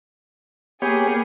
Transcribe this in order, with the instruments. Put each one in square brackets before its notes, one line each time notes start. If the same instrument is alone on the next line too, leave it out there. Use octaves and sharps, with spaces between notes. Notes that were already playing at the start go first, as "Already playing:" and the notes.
[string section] A#3 G#4 [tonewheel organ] B3 G4 C#5